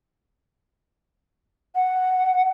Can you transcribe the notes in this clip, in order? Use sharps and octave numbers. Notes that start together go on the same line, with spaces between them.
F#5